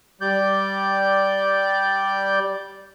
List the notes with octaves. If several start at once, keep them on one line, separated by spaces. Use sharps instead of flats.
G3 D5 G6